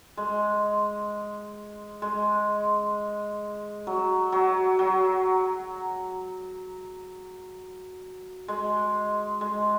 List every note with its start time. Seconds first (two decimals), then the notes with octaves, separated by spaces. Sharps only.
0.17 G#3
2.02 G#3
3.87 F#3
4.32 F#3
4.79 F#3
8.48 G#3
9.41 G#3